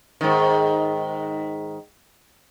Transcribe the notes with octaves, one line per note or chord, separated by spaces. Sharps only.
G#2 D#3